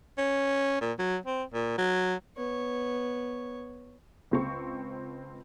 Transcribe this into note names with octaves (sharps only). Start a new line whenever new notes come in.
C#4
A#2
F#3
C4
A#2
F#3
B3 C#5
C#2 C4 C#6